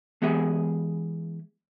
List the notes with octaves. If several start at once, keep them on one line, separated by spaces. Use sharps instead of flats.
E3 G#3 B3 G4 G#4 E5